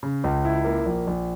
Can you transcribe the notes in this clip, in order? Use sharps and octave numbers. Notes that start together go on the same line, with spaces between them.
C#3
C#2
E4
A#3
A#1
A#1